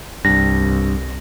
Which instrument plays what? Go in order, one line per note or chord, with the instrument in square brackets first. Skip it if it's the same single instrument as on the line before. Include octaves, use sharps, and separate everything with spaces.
[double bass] C2 [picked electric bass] G2 [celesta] A#6